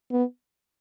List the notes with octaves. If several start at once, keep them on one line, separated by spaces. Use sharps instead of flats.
B3